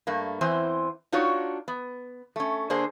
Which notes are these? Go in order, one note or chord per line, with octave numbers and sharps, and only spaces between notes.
G2 A3 A#3
E2 E3 C4 C5 G#5
D4 D#4 F4 F#4 C#5
B3
A3 C#4
D3 A#3 D4 G#4 C5